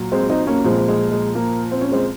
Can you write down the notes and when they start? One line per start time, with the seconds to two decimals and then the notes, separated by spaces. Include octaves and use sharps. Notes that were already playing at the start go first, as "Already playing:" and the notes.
Already playing: A#2 F#3
0.12 G#3 C4
0.29 C4 D#4
0.47 A#3 C#4
0.64 A#2 F3 G#3 C4
0.88 G#3
1.12 G#3
1.35 A#3
1.72 C4
1.81 C#4
1.92 G#3 C4